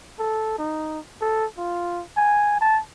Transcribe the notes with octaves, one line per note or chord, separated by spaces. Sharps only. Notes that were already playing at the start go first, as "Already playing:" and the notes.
A4
D#4
A4
F4
G#5
A5